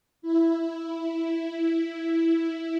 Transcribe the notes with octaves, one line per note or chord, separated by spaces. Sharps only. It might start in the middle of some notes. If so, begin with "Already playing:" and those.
E4